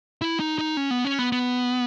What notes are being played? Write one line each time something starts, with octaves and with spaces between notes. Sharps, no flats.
E4
D#4
D#4
C#4
B3
C#4
B3
B3